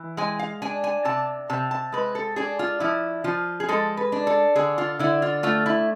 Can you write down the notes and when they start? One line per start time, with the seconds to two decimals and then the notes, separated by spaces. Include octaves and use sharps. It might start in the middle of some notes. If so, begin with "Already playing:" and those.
Already playing: E3
0.17 G#3 G#5
0.39 F5
0.62 D4 G#5
0.84 G#5
1.05 C3 A5
1.50 C3 A5
1.71 A5
1.92 G#3 B4
2.15 A4
2.36 D4 G#4
2.59 F4
2.80 F3 E4
3.24 F3 F4
3.60 G#4
3.69 G#3 A4
3.97 B4
4.12 D4
4.27 A4
4.56 D3 G#4
4.78 F4
4.99 D3 E4
5.22 F4
5.43 A3 F4
5.66 E4